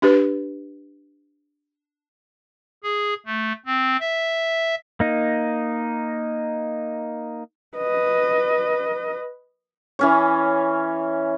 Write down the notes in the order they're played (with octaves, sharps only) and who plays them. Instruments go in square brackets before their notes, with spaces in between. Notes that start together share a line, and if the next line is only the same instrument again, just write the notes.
[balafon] D4 G4 B4
[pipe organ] G#4
A3
C4
E5
[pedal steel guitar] A#3 D#4
[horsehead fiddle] B4 D#5
[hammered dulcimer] E3 C#4 C#5